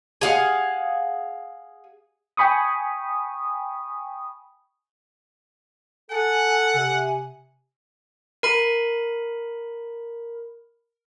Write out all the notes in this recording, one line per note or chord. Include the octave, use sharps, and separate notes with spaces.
G#4 F5 F#5
G5 G#5 B5 C#6 D#6
A4 F#5 G#5
C3 G#5
A#4 B5